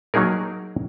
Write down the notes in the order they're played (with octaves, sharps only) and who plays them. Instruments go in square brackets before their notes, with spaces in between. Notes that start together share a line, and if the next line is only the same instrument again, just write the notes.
[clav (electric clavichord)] F#3 A#3 D#4 G#4 A#4